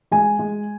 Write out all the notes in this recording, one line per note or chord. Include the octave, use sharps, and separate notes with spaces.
G#3 G#5
G#3